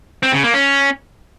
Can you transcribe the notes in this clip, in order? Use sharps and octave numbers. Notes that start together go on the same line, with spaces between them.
C4
C#3
A#3
C#4